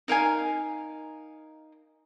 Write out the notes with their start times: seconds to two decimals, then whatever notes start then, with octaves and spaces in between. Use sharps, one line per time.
0.08 D#4 A#4 F5 G#5